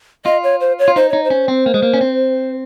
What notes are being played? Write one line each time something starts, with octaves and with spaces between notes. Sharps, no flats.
F4 D#5
C#5
C5
C#5
F4
D#4 C5
D#4 C#5
C5
C#4
C4
A#3
G#3
A#3
C#4
C4